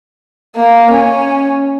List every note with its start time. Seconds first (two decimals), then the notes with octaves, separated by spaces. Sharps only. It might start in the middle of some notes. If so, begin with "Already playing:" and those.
0.56 A#3
0.91 C#4